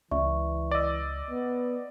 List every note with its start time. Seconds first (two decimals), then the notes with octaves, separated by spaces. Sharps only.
0.11 C#2 E3 D5 E5 C#6
0.71 D5 D#5 D6 E6
1.30 B3